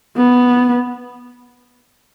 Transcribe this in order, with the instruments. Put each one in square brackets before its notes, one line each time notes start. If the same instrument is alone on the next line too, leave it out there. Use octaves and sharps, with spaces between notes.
[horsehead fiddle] B3